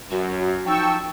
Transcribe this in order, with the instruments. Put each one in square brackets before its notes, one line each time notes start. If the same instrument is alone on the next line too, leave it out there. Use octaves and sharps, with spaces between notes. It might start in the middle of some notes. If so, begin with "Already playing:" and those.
[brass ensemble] F#2 [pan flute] F#4
[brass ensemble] F3 A5 [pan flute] D#4 [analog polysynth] G5 C#6 E6